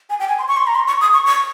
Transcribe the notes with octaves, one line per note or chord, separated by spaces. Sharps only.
G#5
G5
G#5
C6
C#6
C6
A#5
C6
C#6
D#6
C#6
C#6